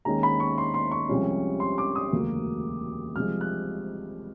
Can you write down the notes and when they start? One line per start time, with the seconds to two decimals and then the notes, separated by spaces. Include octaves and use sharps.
0.05 D#2 D#3 G#3 C#4 A#5
0.23 B5
0.40 C#6
0.58 C6
0.74 C6
0.91 C#6
1.09 C2 C3 F3 G#3 C#4
1.60 C6
1.78 D6
1.96 D#6
2.12 E1 D2 C#3 F#3 A#3
3.15 C2 C3 F3 G#3 F6
3.41 F#6